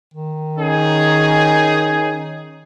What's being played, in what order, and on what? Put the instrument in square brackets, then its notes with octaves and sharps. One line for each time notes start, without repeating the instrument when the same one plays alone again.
[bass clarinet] D#3
[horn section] C#4 D#4 G#4